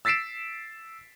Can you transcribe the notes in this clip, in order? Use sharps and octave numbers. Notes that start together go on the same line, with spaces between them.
E6 A6 B6 C7 D7 E7